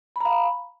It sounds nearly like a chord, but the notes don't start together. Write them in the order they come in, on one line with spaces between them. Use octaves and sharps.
B5 A#5 F5